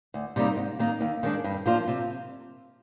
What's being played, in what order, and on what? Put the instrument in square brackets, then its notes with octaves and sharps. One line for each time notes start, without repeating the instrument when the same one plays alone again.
[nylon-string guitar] D2
C3 G3 A#3 D#4
G#2
D#3 A#3 D#4
D#2
D#3 G#3 D4
G2
F3 A#3 D4 F4
C3